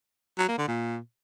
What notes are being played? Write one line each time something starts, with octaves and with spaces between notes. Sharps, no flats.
F#3
A#3
D3
A#2